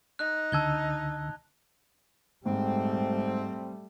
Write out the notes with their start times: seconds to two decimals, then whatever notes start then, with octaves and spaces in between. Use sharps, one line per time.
0.19 D#4 F#6
0.52 C#2 D3 A5 E6 G#6 G7
2.46 G#2 G3 A3 C4